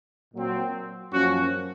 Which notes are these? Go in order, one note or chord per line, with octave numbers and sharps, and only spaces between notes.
A#2 F#3 C4
F#2 F3 A#3 C#4 F#4